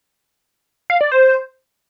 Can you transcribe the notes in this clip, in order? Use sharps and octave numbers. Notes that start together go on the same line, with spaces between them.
F5
D5
C5